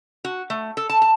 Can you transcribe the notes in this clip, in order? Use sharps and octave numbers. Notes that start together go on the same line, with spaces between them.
F#4
A3
A4
A5
A5